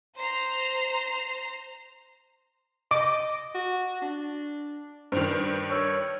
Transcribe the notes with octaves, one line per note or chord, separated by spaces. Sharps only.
C5 A#5 C7
D#5 D6
F#4
D4
G2 D#3 C5
C#5 C#6 E6